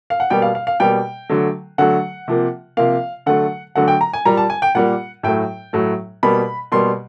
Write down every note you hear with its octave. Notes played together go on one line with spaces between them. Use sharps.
F5
F#5
B2 G3 A#3 G5
F5
F5
F5
B2 G3 A#3 G5
D3 F#3 A3
D3 F#3 A3 F#5
C3 F3 A#3
C3 F3 A#3 F5
D3 F#3 A3 F#5
D3 F#3 A3 F#5
G5
A#5
G#5
A#2 G3 A#3 A#5
A5
G#5
G5
A#2 G3 A#3 F#5
A2 F#3 A3 G5
A2 F#3 A3
B2 G3 A#3 B5
B2 G3 A#3 C6